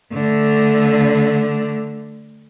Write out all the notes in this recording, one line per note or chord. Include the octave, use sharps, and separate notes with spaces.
D3 A3